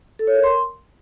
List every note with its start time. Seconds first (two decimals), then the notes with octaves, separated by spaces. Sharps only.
0.19 A4
0.27 C#5
0.35 A#4
0.44 C6